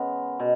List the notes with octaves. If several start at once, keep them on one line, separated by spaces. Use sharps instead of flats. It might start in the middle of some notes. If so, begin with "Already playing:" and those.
Already playing: C#3 G#3 B3 A#4
B2